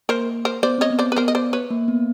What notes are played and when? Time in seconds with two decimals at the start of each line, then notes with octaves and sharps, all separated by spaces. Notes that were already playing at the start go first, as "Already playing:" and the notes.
0.09 A#3 A#4 C5
0.45 A#4 C5
0.63 B3 C5 D5
0.78 C4 C#5 D#5
0.90 B3
0.99 C5 D5
1.12 B4
1.16 B3 A#4 C5
1.28 D#5
1.35 C5 D5
1.53 B4 C#5
1.70 A#3
1.88 B3